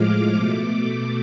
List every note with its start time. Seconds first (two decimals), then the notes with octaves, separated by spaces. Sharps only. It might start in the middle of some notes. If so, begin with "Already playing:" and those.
Already playing: A2 F3 G#3 D6 F6
0.34 B2 A3